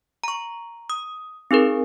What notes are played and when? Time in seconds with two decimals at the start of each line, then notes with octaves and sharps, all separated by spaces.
0.24 A#5 C#6
0.90 D#6
1.51 C4 D#4 G#4 A#4